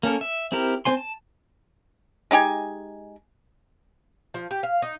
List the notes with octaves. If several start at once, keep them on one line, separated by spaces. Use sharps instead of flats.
A#3 C#4 A4 A#4
E5
C4 E4 G4 A#4
C4 C5 G#5 C6
A5
G#3 D#4 G4 G#5
F3
G4
F5
D#4